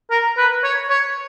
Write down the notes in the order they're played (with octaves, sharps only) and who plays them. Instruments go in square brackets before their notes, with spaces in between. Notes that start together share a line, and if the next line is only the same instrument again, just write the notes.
[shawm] A#4
B4
C#5
C#5